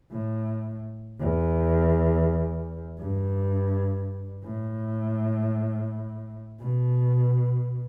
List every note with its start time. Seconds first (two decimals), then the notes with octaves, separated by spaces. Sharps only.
0.12 A2
1.19 E2
2.99 G2
4.43 A2
6.60 B2